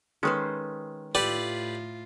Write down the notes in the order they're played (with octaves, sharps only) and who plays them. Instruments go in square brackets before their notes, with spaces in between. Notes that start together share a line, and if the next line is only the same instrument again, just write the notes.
[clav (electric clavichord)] D#3 G#3 C#4 [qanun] A4 B4 C5
[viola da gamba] A2 F4 [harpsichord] G4 B4 D5 [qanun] A4